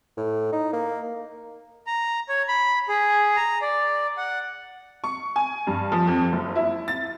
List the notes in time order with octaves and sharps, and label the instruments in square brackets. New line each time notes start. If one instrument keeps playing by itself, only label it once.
[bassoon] A2
D#4
A#3
[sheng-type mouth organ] A#5
C#5
B5
G#4
A#5
D5
F#5
[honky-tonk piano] C#6
G#5
G2
F3
F2
F#1
E4
A6